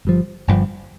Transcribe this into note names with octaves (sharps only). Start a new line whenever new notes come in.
G1 G2 F3
G1 G2 F3